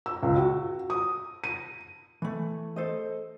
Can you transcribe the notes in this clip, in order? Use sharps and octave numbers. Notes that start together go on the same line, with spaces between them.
E6
C#2
F#4
D#6
D#7
E3 A3
A4 C5 D#5